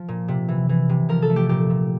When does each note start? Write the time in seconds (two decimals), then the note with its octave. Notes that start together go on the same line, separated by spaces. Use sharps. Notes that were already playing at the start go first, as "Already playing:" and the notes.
Already playing: F3
0.08 A#2
0.28 C3
0.48 E3
0.69 E3
0.89 C3
1.09 F3 A#4
1.22 A4
1.29 A3
1.36 G4
1.49 A#2 G4
1.70 A#2